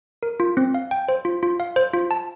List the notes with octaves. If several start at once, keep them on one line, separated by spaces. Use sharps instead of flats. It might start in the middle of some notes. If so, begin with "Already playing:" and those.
A#4
F4
C4
F5
G5
C5
F4
F4
F5
C5
F4
A5